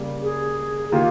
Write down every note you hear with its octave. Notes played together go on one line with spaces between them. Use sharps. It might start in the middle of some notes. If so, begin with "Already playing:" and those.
Already playing: C#3 G3 A#3
G#4
D#3 A#3 F4 G4